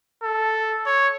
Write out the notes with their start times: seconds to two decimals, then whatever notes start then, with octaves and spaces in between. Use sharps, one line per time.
0.23 A4
0.86 C#5